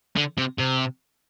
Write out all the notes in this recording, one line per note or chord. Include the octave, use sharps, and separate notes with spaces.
D3
C3
C3